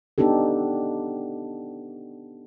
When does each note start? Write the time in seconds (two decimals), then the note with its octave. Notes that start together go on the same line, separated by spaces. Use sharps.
0.18 B3 D4 D#4 G4 A4